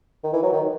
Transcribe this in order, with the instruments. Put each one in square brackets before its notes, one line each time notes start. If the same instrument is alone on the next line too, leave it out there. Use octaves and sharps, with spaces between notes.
[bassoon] D#3
E3
F#3
D#3